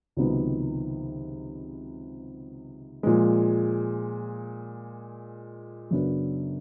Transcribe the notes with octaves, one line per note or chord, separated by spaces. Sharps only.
C#2 C3 D#3 F#3 B3
A#2 F3 G#3
F#2 C#3 F#3 B3 D4